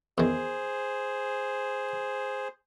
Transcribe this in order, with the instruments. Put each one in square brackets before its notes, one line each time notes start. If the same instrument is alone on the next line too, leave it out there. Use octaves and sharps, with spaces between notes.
[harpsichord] E2 D#3 [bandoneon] G#4 C5